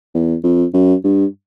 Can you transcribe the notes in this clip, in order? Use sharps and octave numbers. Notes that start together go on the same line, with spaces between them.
E2
F2
F#2
G2